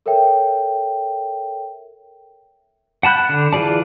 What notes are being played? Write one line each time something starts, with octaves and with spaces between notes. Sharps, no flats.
A4 A#4 C#5 E5 G5
F#5 A5 B5 F#6 G6
D3
E3 F4 G#4 D5 A5